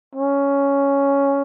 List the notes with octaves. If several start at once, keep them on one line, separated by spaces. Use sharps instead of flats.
C#4